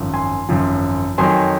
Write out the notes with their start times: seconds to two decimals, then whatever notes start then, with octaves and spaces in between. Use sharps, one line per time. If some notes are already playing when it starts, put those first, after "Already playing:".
Already playing: G#1 F#2 F3
0.14 G#5 C6
0.49 G#1 F#2 F3
1.18 F2 D#3 F#3 G#5 C6